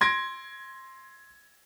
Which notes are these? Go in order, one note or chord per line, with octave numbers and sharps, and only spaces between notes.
C6 G#6 A#6 D7